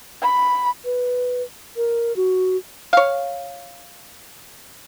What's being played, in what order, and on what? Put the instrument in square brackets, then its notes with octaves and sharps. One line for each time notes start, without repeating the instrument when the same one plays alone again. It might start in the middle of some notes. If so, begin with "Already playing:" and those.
[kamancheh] B5
[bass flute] B4
A#4
F#4
[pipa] C#5 F5